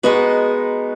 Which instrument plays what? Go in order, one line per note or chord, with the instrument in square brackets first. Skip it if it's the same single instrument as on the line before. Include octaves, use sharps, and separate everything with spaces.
[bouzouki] G#3 D#4 F#4 [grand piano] B3